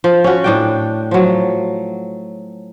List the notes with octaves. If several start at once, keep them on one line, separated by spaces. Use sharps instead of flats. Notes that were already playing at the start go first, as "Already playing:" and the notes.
F3
C#4 F#4
A2 D4 G5
F3 F#3